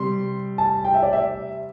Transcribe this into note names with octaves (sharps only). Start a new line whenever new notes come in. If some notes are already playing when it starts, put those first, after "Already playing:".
Already playing: C3 G3 C6
A5
G5
E5
D5
E5